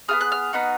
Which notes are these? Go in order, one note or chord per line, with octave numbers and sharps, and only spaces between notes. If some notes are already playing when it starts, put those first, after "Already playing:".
B3 F4 G#4 F6
F#6
F6
B3 D#4 F#4